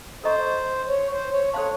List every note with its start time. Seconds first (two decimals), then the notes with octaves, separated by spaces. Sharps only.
0.23 A4 C5 D#5 A#5 C#6
0.88 C#5
1.10 C5
1.31 C#5
1.54 A4 C5 C#5 F5 A5 C6